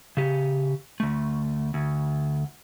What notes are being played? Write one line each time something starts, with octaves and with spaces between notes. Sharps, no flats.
C#3 G4
D2 A3
D2